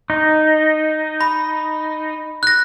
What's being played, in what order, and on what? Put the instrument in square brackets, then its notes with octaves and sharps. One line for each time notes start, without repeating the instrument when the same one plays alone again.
[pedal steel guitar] D#4
[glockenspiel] B5
F#6 A#6